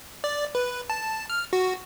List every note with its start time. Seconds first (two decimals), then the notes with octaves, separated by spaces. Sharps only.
0.24 D5
0.55 B4
0.90 A5
1.30 F6
1.53 F#4